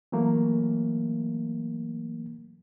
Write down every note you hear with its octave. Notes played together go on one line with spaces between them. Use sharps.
E3 F#3 A3 A#3